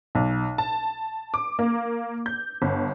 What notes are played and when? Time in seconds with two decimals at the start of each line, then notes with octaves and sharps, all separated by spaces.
0.15 B1
0.58 A5
1.34 D6
1.59 A#3
2.26 G6
2.62 G1